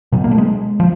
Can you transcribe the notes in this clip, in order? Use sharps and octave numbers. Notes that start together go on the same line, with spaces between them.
B2 F#3
A#3
A3
G#3
F3